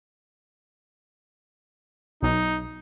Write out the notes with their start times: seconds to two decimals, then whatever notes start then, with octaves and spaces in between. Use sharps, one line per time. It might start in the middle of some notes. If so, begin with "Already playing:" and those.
2.22 B1 D#4